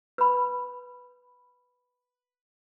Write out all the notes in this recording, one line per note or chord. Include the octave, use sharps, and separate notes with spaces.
B4 B5